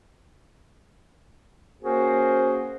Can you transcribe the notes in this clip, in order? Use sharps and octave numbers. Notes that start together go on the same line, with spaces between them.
A#3 C#4 F#4 G#4 A#4 C5